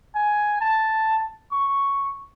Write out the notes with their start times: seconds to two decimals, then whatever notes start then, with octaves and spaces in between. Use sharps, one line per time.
0.15 G#5
0.61 A5
1.52 C#6